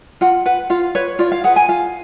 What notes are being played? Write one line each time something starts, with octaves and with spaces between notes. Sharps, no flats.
F4 F#5
B4 F#5
F4 F5
B4 C#5
F4 D5
F5
G#4 B4 F#5
G#5
F4 F5